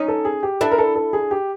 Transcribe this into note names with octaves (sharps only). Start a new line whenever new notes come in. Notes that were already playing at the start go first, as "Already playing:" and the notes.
Already playing: C#4 D#4
A4
G#4
G4
D4 E4 A4
A#4
A4
A4
G#4
G4